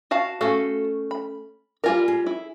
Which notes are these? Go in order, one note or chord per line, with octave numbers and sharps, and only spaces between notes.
F#4 F5 A5
A3 C#4 F#4 A4 F5
B5
G3 F4 A#4 D5 G#5
G#4
E4